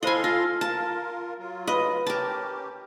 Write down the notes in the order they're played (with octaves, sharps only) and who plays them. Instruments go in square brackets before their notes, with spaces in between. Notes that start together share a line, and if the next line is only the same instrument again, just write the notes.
[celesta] E4 C5 B5 [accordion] A4 F5 C6 [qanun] D#5 G#5
[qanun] F4 [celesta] F6 A#6
[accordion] F4 A#4 [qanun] A5
[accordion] F#3 F4
[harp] B4 [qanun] D#5
[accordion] C#4 G4 [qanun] A#4 A5